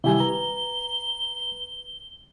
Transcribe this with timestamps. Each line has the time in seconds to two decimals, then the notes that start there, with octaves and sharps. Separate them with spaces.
0.04 C3 D#3 G3 E4 G4 G#5 G7
0.20 B4 A#5